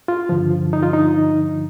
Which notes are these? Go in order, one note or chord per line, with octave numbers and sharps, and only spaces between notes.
F4
G2 D3 F3
D#4
F4
D#4